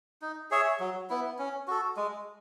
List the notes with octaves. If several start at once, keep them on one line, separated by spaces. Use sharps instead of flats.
D#4
G#4 C#5 E5
F#3
B3 E4
C#4
F#4 A4
G#3